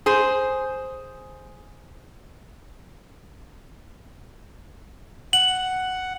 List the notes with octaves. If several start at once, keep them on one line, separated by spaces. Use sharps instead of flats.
G#4 C5
F#5 F#7